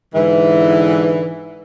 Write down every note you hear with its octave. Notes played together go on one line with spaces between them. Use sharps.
G#2 D3 E3